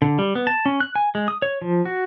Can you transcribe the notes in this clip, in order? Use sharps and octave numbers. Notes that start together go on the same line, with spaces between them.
D3
G3
B3
A5
C#4
F#6
G#5
G#3
D#6
C#5
F3
F#4